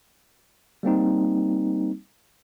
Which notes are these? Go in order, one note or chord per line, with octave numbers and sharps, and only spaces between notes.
G3 A#3 C4 D#4